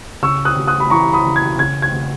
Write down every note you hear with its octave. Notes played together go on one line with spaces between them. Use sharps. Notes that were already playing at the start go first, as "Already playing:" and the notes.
C#3 C#6 E6
D#6 F#6
C#3
D#6 F#6
B5
E3 A#5 C#6
B5 D#6
C#3
G#6
C#3 G#6
G#6
C#3